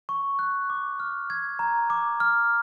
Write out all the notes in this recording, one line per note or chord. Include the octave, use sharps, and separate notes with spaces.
C#6
F#6
D6
F6
G#6
A#5
D6
F6